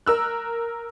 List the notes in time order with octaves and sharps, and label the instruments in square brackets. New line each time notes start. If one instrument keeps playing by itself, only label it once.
[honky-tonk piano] A#4 E6 F#6